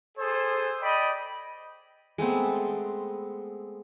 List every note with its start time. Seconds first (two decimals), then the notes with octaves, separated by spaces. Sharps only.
0.18 G#4 A4 C5
0.81 D5 D#5 G5 B5
2.18 G#3 A3 B3 C4